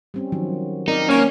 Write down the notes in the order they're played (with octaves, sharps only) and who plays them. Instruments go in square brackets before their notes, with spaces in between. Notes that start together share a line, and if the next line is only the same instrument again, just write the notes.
[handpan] G3 C4 C#4
D#3 F3 F#3
[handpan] C4 A#4 D5 [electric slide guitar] D#4
[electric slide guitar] A#3 [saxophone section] C#4